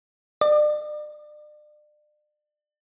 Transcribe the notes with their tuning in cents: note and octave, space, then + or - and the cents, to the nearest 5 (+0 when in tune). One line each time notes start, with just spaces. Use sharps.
D5 +35